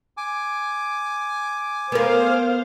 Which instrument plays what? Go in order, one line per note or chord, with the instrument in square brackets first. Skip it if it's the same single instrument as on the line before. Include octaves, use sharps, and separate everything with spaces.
[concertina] G#5 D6
[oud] B3 A#4 [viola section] C5 F5